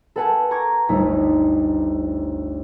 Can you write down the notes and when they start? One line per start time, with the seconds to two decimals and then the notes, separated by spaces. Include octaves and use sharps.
0.16 A4 B4 F#5 G#5 A5
0.51 A#5 C#6 D6 G#6 A#6
0.89 G1 D2 A3 D#4 B6